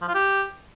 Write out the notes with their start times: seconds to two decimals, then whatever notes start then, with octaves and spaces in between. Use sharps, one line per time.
0.02 F3
0.08 F4
0.15 G4